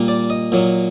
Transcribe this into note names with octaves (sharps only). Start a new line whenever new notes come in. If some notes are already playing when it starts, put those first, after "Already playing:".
Already playing: A#2 G3 A#3
D5
D#5
A#2 F#3 A#3